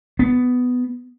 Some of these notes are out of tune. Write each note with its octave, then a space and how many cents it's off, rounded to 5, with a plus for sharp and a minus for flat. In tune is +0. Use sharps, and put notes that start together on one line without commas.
B3 +10